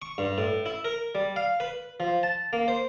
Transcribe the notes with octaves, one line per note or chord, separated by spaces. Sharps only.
C#6
G2
A2
E4
A#4
G3
F5
B4
F3
A5
A#3
C5